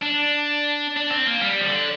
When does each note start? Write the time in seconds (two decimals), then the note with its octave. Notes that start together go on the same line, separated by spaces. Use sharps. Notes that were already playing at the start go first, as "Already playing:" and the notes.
0.02 D4
0.97 D4
1.11 C4
1.27 A#3
1.42 G3
1.61 F3
1.66 D3